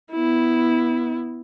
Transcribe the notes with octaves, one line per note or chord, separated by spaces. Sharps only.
B3 E4